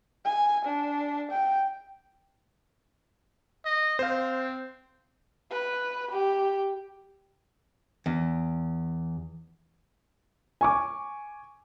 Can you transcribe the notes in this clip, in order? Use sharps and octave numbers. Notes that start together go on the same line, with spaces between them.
G#5
D4
G5
D#5
C4 C5 F5
B4
G4
E2
G#5 C#6 D6